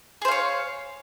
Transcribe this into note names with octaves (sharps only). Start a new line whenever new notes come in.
G#4 C5 C#5 F5